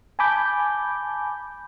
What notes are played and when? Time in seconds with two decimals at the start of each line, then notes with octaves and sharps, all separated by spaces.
0.19 G#5 A5 B5 D6 G6